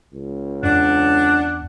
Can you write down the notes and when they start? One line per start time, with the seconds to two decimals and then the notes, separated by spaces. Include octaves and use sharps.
0.13 C#2
0.63 E2 D4 F#5